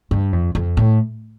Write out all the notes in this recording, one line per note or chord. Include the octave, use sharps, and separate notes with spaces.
G2
F2
F2
A2